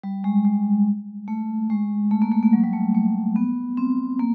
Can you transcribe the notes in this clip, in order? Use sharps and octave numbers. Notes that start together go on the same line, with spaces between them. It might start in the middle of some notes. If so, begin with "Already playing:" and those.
G3
G#3
G#3
A3
G#3
A3
A#3
A3
A#3
F#3
G3
A3
A3
B3
C4
A#3